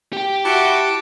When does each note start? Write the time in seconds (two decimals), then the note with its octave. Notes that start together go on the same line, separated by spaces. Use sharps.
0.13 G4 G5
0.45 E4 F#4 A5 D6